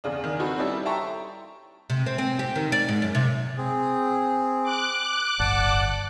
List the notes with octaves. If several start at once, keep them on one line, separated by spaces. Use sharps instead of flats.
E2 C#3 D4
D#3
C4 D#4 F#4 A4 B4
G3 C#4 D#4 E4 G4 A4
E5 G5 A5 A#5 C6 C#6
C3
C4
C4
G4
D#3
D5
G#2
F#2
C3
C4 G#4
D6 F#6
D1 G1 D5 F#5 A5